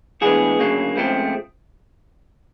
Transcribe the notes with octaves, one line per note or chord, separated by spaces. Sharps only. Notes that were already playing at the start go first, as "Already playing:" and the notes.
A2 E3 G#3 B3 D4 F#4 G#4
D2 C#3 F#3 A#3 D4
C#2 C#3 F3 A3 C4